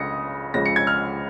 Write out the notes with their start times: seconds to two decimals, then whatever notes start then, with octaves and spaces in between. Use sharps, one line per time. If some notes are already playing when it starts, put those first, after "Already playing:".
Already playing: C#2 C#3 D#6 A#6 C#7
0.54 C#2 C#3 F3 A#6
0.66 C#7
0.76 G#6
0.87 F6